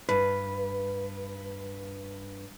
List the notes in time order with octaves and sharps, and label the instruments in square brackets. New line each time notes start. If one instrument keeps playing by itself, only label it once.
[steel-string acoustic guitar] G2 [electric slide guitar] B4